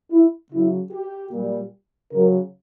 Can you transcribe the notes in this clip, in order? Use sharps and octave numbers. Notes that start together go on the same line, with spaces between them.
E4
C#3 F#3 E4
G4
A#2 G3
C#3 F#3 A#4